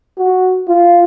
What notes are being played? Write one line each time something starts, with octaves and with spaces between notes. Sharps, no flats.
F#4
F4